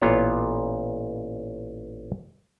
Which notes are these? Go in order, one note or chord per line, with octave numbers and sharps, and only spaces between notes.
A1 A#2 B3 F4 C#5